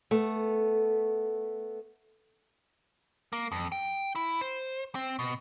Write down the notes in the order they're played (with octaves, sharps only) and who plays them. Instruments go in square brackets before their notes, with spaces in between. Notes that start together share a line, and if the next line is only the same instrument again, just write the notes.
[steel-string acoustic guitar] A3 B3
[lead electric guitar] A#3
F2
G5
E4
C5
C4
B2